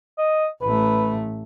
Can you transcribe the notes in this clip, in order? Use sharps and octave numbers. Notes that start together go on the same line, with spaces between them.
D#5
A1 A3 B4